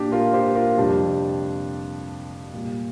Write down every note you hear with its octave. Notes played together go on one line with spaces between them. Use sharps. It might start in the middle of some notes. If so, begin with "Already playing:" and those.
Already playing: A#2 D4 G4
F4 A#4
G4 C5
F4 A#4
F2 C3 G3 D4 G4
A#2 G3